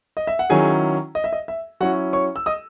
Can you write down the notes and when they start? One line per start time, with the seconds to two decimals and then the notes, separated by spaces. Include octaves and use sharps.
0.17 D#5
0.27 E5
0.39 F#5
0.50 D#3 F#3 C#4 E4 G#4 G#5
1.15 D#5
1.24 E5
1.33 D#5
1.48 E5
1.80 F#3 C#4 E4 F#4 F#5
2.13 C#5 C#6
2.36 E6
2.46 D#5 D#6